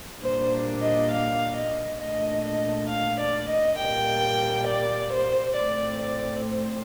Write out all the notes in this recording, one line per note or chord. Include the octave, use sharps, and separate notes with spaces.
A#2 G3 A#3 D4 C5
D#5
F5
D#5
A#2 A3 D4 D#5
D#5
F5
D5
D#5
A#2 G3 A#3 G5
D5
C5
A2 A3 C4 D5
D5
C5